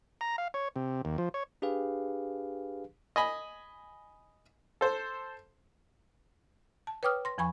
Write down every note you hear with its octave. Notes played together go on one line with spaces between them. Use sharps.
A#5
F5
C#5
C3
D#2
F3
C#5
D4 G4 G#4 B4 F5
D#5 G#5 B5
A4 C5
A5
B4 C#5 G5 D6 D#6 F6
C6 A#6
E2 F3 G#5 B5 C#6